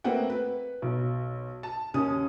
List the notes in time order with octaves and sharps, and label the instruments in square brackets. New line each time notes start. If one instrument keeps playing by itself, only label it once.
[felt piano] A3 A#3 C4 B4 F#5 G5
B4
B1
A5
D#2 C#4 D#6